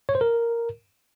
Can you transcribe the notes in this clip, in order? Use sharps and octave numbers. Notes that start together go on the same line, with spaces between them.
C#5
C5
A#4